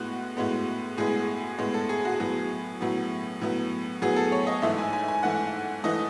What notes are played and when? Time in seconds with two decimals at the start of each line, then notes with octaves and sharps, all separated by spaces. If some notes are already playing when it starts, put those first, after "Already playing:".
Already playing: A2 G#3 B3 F#4
0.37 A2 G#3 B3
0.98 A2 G#3 B3 G#4
1.58 A2 G#3 B3
1.74 A4
1.89 G#4
2.05 F#4
2.20 A2 F#3 B3 G#4
2.81 A2 F#3 B3
3.41 A2 F#3 B3
4.02 A2 F#3 B3 G#4
4.16 A4
4.32 C#5
4.47 D#5
4.62 G#2 E3 A3 E5
4.78 G#5
4.93 G#5
5.08 G#5
5.23 G#2 E3 A3 F#5
5.84 E3 A3 D#5